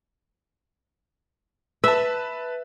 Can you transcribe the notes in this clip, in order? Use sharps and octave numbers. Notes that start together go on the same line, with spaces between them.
B4 E5 A5